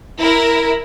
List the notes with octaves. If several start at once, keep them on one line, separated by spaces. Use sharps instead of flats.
E4 A#4